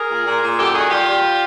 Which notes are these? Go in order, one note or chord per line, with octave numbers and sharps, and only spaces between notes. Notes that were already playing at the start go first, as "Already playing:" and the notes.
Already playing: G#4 A#4
A#2
A#2
A#2
F#2 G4 A4
D#3 F#4 G#4
G3 F4 G4
G3